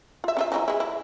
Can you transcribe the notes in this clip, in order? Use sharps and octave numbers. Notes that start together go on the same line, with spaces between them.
F4 E5
C#4 F4 E5
E3 F#3 D#4
G#3 E4
E4